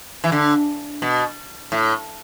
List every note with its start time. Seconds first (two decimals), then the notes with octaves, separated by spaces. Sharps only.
0.24 E3
0.32 D3
1.02 B2
1.72 A2